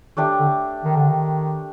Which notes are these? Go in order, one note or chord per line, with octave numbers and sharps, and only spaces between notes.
D#3 A3 D4 G4
D3
D#3
D3
D#3